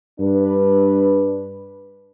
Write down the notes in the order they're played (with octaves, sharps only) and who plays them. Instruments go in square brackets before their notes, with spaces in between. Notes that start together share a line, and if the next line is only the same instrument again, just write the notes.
[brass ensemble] G2 D4 B4